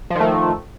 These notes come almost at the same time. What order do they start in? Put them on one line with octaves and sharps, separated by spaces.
F3 D#3 A3